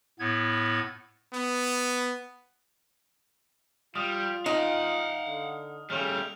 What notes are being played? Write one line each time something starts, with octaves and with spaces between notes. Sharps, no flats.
A2 B3 G#6
B3
G3 F4 D#6 F6
D#4 F5 F#5
D3
C#3 G3 A3 F6 F7